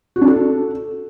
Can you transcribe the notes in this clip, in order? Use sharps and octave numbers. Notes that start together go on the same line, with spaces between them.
F#4
D4
A4